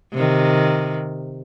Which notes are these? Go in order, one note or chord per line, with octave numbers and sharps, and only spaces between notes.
C3 D#3